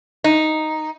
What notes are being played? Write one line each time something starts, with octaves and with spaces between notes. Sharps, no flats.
D#4